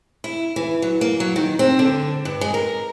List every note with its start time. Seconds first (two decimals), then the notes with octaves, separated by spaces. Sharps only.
0.24 E4
0.56 E3
0.82 F#3
1.01 A#3
1.20 F#3
1.36 D#3
1.59 C4
1.79 D3
2.25 G2
2.41 G#3
2.54 A#4